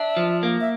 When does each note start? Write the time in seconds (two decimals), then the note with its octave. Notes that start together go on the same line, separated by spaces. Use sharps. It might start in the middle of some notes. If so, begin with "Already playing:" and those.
Already playing: D4 E5
0.17 F3
0.43 A#3
0.61 E5